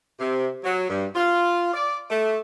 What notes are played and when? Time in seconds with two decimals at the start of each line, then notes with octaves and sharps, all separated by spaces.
0.20 C3
0.64 F#3
0.89 G2
1.16 F4
1.74 D5
2.10 A3